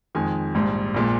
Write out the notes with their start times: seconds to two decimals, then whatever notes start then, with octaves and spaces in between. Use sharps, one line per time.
0.15 F2 D#3 G#3 G#5
0.54 A#1 G#2 G3
0.94 A#1 A#2 G#3